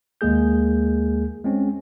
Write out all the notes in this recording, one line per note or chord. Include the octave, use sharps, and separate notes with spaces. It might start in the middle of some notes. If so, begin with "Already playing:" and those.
D#2 G#3 A#3 G#4 G6
G#3 C4 C#4